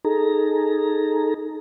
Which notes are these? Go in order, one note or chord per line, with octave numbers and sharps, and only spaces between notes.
D#4 G#4 A4 A#5